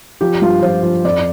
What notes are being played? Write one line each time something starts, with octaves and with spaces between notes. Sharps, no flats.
F3 G4
G2 F4
F3 C5
F3
F2 D5